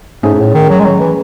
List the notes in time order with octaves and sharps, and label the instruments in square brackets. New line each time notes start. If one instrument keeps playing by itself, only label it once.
[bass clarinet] G#2 [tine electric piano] A3 C#4 G#4
[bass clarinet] G#2
A2
D#3
F#3
G#3
F#3
E3